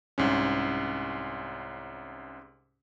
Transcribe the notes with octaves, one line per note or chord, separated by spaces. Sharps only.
C2 G#2 C#4